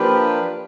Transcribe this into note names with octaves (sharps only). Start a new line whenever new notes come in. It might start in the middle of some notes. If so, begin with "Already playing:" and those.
Already playing: F3 A#3 D4 G4 B4